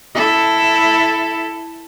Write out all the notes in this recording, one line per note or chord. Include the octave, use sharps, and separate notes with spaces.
E4 A4